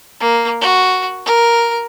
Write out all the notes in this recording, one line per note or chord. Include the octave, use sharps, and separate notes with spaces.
A#3
F#4
A#4